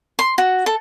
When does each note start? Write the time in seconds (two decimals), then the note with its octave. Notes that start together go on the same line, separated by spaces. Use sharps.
0.19 C6
0.38 F#4
0.66 A4